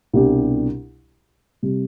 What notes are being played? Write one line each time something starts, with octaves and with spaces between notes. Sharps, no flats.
C2 B2 G3 D4 G4
C3 G3